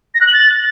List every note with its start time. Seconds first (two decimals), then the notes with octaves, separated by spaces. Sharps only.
0.15 A#6
0.21 F#6
0.27 F#7
0.33 A6